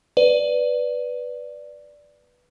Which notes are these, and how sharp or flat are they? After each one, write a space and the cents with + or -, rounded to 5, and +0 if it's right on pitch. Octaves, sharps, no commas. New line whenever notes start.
B4 +0 D5 +0